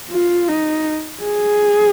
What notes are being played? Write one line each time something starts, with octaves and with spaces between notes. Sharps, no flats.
F4
D#4
G#4